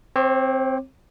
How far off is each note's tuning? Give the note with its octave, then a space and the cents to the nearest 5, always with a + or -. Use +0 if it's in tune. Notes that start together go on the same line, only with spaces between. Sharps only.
C4 +0 C#5 -45 D6 +0